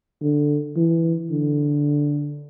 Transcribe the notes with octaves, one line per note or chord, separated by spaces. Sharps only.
D3
E3
D3